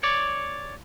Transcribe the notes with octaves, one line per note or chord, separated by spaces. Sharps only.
C#5 D5